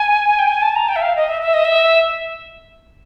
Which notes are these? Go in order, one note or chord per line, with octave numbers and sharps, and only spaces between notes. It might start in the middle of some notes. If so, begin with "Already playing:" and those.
Already playing: G#5
G5
G#5
A5
A#5
G5
E5
F5
D#5
E5
E5
D#5
E5